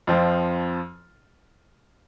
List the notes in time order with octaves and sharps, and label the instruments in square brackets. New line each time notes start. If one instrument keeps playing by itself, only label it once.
[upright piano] F2 F3 C4 F4